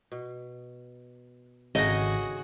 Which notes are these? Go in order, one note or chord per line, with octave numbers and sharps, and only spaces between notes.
B2
G#1 C#3 D#4 F#4 G#4 A4 D#5 A#6